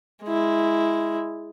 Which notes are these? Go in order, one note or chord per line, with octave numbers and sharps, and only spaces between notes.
G#3 E4